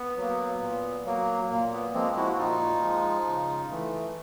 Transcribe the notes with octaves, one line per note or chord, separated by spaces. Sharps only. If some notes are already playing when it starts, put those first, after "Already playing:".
Already playing: B3
F#3 A#3
A#2
F#3 A#3
A#2 A#3
B3
F3 G#3 A#3 C4
E4 F#4
F#4
A#2 D#4 F4
F3 G#3
C#3
E3 A3